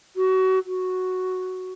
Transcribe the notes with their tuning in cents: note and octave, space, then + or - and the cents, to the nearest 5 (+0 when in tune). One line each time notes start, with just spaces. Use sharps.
F#4 +25
F#4 +0